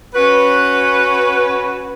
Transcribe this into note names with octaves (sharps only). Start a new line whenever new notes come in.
C#4 F#4 B4